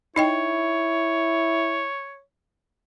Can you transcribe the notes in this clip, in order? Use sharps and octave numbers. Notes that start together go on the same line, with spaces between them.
D#4 E4 C#5 D#5 G5